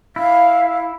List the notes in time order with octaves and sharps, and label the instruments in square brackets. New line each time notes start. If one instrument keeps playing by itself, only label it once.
[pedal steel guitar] E4 [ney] F5